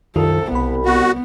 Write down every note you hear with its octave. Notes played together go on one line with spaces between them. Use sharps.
C2 F#2 D#3 F4 A4
B1 B3 B5
B3 F#4